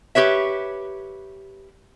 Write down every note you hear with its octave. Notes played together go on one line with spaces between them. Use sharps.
G4 B4 C#5 E5